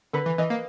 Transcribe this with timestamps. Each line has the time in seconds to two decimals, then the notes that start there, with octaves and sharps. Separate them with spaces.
0.13 D3 B4
0.26 E3
0.38 E3 D#5
0.50 A#3